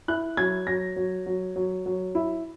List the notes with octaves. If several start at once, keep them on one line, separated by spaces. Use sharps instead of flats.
E4 F#6
F#3 G#6
F#3 A#6
F#3
F#3
F#3
F#3
E4